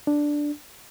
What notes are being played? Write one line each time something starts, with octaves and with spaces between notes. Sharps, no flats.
D4